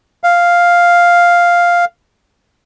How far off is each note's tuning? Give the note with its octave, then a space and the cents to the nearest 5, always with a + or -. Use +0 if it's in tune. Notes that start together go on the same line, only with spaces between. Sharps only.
F5 +0